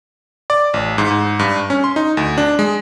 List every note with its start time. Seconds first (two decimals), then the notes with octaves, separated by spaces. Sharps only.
0.50 D5
0.74 A1
0.98 G#2
1.11 G#2
1.39 G2
1.70 C#4
1.84 C6
1.96 D#4
2.17 D2
2.38 D4
2.59 G#3